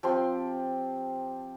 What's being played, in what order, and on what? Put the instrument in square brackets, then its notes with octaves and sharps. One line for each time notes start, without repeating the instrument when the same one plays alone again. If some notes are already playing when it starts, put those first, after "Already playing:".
[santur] F3 C4 G4 C6